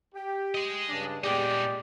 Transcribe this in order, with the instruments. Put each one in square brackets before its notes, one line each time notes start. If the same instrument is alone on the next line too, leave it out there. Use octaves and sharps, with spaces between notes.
[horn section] G4
[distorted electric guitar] G#4 D#5
[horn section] G2 C#3 D4
[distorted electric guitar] A#2 D#4 [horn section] G#3 B3 G4 [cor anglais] D5